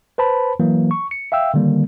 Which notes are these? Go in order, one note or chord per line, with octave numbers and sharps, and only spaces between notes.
B4 C5 A5 B5
E3 F#3 A#3
C#6
C#7
E5 F5 G5 E6
D3 D#3 G3 A#3